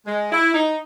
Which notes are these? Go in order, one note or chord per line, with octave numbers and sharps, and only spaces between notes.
G#3
E4
D#4